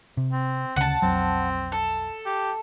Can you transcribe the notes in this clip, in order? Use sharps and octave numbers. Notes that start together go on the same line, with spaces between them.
C3
C4
D2 C#3 F#5 A5
B1 F2 F#3 C4
A4
G4